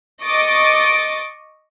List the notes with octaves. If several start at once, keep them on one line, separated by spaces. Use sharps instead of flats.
D#5 C#6 D6 A6 D7